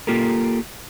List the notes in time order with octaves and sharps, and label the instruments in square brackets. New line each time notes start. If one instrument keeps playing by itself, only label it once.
[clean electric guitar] A#3 F4 G4 A4 A#4